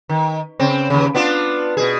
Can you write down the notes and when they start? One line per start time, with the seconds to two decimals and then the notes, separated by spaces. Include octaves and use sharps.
0.09 D#3
0.59 C#3 C4
0.90 D#2 C#3
1.15 B3 D4 F4
1.77 B2 G#4